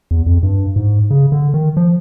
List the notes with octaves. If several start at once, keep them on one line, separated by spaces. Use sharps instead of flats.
E2
F2
G2
G#2
C#3
D3
D#3
F3